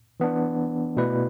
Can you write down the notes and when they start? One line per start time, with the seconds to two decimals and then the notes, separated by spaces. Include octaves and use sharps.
0.20 E3 B3 D4
0.97 B2 A3 E4 B4 D5